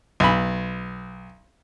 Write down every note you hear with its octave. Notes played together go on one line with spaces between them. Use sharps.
B1 B5